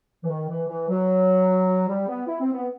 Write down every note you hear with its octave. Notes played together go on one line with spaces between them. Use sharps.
E3
D#3
E3
E3
F#3
G3
B3
E4
C4
B3